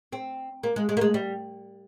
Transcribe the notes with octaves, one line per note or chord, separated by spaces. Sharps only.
C4
A#3
G#3
G#3
A#3
G#3
G3